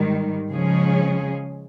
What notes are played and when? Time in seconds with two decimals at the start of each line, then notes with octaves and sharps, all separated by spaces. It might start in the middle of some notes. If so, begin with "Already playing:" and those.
Already playing: G#2 D#3 G3
0.51 C#3 F3 G#3 C#4 G#4